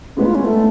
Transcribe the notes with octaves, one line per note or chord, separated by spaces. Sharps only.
A2 G#3 B3 C#4
F4
C#4
A3